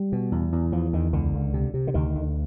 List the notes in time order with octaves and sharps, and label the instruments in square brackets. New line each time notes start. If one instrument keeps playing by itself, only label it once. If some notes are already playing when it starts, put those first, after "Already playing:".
Already playing: [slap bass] G3
B2
E2
E2
E2 F3
E2 D#3
C#2 D3
C#2
C3
C3
D3
D2 D#3
D2